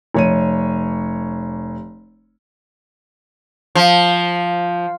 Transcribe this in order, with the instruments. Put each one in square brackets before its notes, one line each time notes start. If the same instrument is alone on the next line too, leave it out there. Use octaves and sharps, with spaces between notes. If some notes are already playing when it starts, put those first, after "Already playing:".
[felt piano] F1 C#5 D#7
[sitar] F3